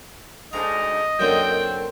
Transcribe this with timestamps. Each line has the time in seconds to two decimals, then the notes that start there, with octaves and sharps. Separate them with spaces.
0.53 D2 G#2 D#5 F5 A#5
1.19 F#2 D3 A#3 C4 G5